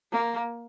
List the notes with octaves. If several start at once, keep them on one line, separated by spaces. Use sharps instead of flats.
A#3